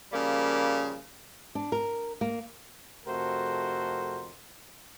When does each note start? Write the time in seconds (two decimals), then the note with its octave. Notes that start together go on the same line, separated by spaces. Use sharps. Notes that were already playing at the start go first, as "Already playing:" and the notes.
0.12 C#3 F3 G3 A#3
1.55 D4
1.72 A#4
2.21 A#3
3.06 F2 C3 A3 F#4 A#4 C5